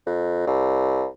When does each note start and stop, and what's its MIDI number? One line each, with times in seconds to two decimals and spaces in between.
0.06 0.46 41
0.47 1.06 36